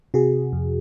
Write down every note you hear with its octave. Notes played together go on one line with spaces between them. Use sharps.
C3 F#4 G#4
F2